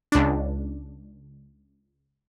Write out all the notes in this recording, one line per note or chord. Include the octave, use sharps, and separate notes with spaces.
C#2 D4